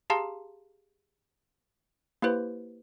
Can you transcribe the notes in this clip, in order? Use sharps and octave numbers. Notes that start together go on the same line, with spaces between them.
G4 G#4 F5 A5 A#5 C6
A#3 E4 G4 B4 C5